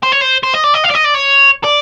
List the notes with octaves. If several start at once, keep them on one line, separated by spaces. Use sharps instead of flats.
C5
C#5
C5
C5
D#5
D5
D#5
F5
D5
D#5
D5
C#5
D5